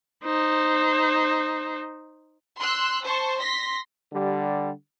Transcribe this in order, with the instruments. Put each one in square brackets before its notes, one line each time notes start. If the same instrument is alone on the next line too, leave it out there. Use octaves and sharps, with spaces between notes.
[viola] D#4 C5
[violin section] C6 E6 F#6
C5 A5 C#6
C6 A#6 B6
[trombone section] D3 G3